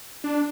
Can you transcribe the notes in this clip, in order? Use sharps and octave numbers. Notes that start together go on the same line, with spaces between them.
D4